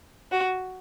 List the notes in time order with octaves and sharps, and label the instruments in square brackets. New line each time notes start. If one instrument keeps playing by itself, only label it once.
[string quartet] F#4